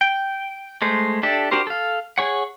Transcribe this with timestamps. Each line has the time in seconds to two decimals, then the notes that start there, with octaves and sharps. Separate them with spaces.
0.01 G5
0.82 G#3 A3 C5
1.23 D4 G4 A4 E5
1.51 D4 F#4 G4 A#4 C5
1.67 A4 F5
2.18 G#4 C#5 F#5